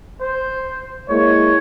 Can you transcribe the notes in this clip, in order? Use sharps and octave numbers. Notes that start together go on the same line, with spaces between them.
C5
G#3 A#3 E4 C#5